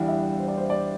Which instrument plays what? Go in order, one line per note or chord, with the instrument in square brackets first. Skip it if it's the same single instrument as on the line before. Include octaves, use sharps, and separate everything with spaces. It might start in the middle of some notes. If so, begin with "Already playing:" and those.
Already playing: [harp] E2 E3 G3 D4 [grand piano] F5
[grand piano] E5
C5
D5
C5
D5